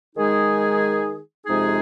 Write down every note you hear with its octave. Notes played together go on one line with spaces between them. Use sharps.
D#3 G#3 D#4 G#4
F2 C3 G#3 D#4 G#4